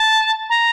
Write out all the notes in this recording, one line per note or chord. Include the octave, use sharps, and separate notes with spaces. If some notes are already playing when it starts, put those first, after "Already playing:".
Already playing: A5
A#5